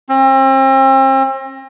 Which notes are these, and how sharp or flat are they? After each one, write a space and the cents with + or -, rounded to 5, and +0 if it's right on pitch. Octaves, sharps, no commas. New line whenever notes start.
C4 +40